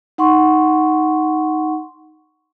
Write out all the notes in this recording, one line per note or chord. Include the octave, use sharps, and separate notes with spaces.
D#4 F#5 C6 C#6